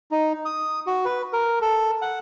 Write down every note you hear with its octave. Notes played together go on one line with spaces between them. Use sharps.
D#4
D#6
F#4
B4
A#4
A4
F#5